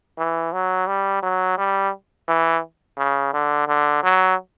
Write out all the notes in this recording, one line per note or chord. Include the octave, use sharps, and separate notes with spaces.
E3
F#3
G3
F#3
G3
E3
C#3
D3
D3
F#3